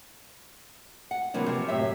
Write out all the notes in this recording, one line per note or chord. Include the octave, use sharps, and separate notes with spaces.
F#5
C3 E3 F#3 A#3 D4
C3 F3
F#2 A2 F#4 G4 E5